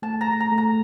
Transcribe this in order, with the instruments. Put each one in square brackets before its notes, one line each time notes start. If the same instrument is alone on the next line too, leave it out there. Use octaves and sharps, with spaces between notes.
[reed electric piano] A3 [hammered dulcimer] A5
[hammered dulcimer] A#5
[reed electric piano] A3
[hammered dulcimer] A#5
[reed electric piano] A3
[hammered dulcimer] A#5